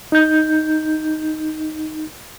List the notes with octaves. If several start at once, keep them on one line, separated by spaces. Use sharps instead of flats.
D#4 G6